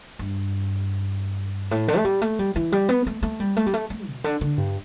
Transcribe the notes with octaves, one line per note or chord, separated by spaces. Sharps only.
G2
A2
D3
A3
G3
A3
G3
E3
G3
B3
A3
A3
G3
A3
G3
A3
A3
B2
D3
D3
G2